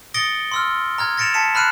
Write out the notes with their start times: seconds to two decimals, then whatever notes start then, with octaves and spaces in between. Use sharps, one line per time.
0.14 D#6 A6 A#6 C#7 D7 G7
0.52 C6 E6 F6
0.98 A#5 F6 G#6
1.17 A6 A#6 C#7 D7 E7 F7
1.34 A5 B6 C#7 E7
1.54 A#5 B5 F6 F#6 C7 D#7